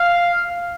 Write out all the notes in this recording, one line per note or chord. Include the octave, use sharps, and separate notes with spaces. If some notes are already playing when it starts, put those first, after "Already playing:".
Already playing: F5